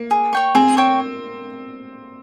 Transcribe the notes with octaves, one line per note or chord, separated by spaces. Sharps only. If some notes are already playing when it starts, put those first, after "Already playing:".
Already playing: A#3
G#4
C#5 G5 C#6
C4 G#4
C#5 G5 C#6